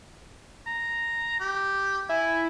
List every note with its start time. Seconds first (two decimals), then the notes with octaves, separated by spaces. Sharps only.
0.67 A#5
1.40 G4
2.09 E4 G#5